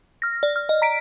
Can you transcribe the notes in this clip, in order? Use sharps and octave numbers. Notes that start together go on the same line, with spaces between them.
F6 A#6
D5
F6
D#5
A#5 B6 D7